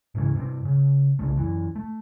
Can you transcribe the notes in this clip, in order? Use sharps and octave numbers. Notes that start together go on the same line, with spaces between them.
D1 G#2 C#3 E3
G2 C3 C4
C#3
C2 C#3 A3
F#2 E3
A3